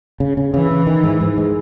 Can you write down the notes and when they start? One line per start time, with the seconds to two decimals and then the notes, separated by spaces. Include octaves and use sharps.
0.20 C#3
0.37 C#3
0.54 C#3 E3
0.71 C#3
0.87 D#3
1.04 G#2
1.21 G#2
1.38 G#3